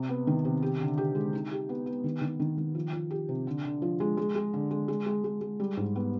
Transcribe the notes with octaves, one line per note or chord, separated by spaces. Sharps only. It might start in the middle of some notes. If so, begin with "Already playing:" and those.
Already playing: C3
B3
D#3
C3
G4
D3
G4
G#3
D#4
G4
B3
B3
D#3
D#3
D#3
D#3
F3
F3
G4
C3
D3
D3
F3
G#3
G#3
G#3
D3
G#3
G#3
G#3
G#3
G#3
G3
G#2
B3